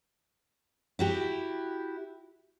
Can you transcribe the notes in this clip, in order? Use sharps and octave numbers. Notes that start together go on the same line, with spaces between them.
E4 F#4 G4